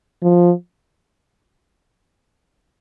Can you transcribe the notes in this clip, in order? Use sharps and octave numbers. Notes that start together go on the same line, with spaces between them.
F3